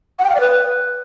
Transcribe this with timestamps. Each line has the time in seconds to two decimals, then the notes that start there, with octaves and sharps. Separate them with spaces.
0.19 F#5
0.24 G5
0.30 F5
0.35 D5
0.40 B4